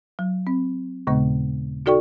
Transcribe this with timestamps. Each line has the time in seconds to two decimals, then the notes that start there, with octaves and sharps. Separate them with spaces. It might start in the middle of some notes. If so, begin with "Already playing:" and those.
0.19 F#3
0.47 C4
1.07 D#2 A#2 C#3 G#3 B3
1.86 D#4 F#4 A4 D5 G5 C#6